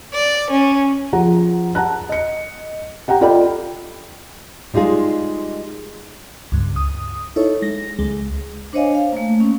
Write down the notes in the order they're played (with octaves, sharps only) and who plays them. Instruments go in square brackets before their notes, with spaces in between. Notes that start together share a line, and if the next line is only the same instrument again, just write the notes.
[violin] D5
C#4
[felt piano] F3 G#4 F#5 A#5
F#5 A5 A#5 F#6
D#5 C#7
G4 F#5 G5 A#5
F4 A4 D5 D#5 G5 B5
[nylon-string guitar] G3 G#3 D#4 F4 G#4
[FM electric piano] C#2 G2
D#6
D#4 E4 A4 C#5
G#3 A#6
C#2 G#3
[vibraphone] D4 C5 C#5 D#5 F5 G#5
F5
A3 A#3
C#4